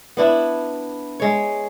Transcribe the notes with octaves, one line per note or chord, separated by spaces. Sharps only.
B3 D4 E4
G#3 C#5